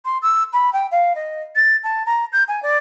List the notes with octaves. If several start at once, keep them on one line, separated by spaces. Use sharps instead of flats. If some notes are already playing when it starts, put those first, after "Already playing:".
C6
E6
B5
G5
F5
D#5
A6
A5
A#5
G6
G#5
D5